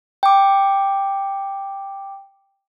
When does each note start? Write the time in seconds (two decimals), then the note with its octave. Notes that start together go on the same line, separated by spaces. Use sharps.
0.23 G5 D6